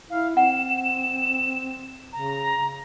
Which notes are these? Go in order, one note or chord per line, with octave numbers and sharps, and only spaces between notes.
E4 F5
C4 F#5 E7
C#3 A#5